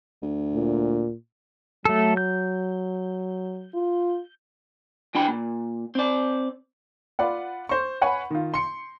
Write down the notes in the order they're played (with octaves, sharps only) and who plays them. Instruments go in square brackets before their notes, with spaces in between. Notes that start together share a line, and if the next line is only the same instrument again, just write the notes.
[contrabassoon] D2
[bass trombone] A#2
[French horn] F#3 [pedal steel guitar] A3 A4
[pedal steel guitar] G6
[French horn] F4
[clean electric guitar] E3 D4 G5 B5
A#2
C4 D5
[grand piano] F4 B4 D5 F#5
C5 C#6
B4 C#5 F#5 G#5 B5
D#3 F4
C6 C#7